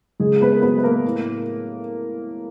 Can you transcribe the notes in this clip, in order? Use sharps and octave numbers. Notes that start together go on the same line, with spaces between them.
C#3 G#3 G#4
B3 B4
A#4
F#3 A3 B3 B4
B4
A#3 A#4
A2